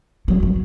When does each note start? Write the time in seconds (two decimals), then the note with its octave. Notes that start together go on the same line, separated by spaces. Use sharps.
0.28 F#3
0.43 F#3